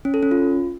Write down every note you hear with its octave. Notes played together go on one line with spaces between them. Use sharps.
C#4
A4
C#4
F4